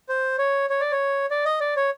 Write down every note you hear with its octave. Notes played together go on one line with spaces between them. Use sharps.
C5
C#5
C#5
D5
C#5
D5
D#5
D5
C#5